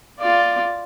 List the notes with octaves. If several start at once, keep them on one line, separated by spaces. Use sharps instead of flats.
F4 D5